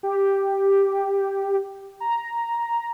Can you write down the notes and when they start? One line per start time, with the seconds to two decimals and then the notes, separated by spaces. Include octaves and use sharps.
0.03 G4
2.00 A#5